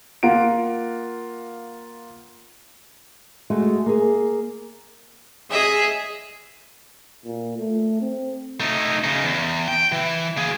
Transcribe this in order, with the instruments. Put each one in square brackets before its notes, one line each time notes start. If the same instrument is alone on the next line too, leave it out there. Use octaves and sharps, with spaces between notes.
[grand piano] A#3 F4 F#5 D7
[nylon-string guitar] G#3 A3 F#4 G#4
A#3 G#4
[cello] G#4 [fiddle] D#5 E5
[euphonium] A#2
A3
C4
[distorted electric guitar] A3 D#4
C#3 D#4
E2
G5
E3
A#3 G#4